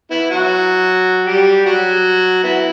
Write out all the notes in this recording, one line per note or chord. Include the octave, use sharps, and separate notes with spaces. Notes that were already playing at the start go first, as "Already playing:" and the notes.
B3 E4
F#3 F#4
G3 G4
F#3 F#4
B3 E4